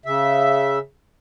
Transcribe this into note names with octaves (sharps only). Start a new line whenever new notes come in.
C#3 E5